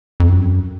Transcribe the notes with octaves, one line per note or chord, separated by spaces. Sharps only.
F2
F#2